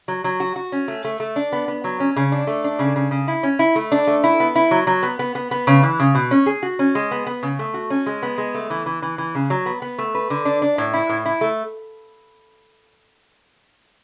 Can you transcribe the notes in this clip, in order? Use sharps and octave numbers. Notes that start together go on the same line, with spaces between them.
F#3
F#3
F#4
F#4
C#4
A3
A3
A3
D4
B3
B3
F#3
C#4
C#3
D4
A3
D4
C#3
C#3
C#3
E4
C#4
E4
A3
D4
A3
E4
B3
E4
F#3
F#3
B3
B3
B3
B3
C#3
E3
C#3
B2
C#4
G#4
F#4
C#4
G#3
B3
B3
C#3
A3
F#4
C#4
G#3
B3
G#3
A3
E3
E3
E3
E3
C#3
F#3
B3
B3
A3
B4
D3
D4
D4
A2
E4
A2
E4
A3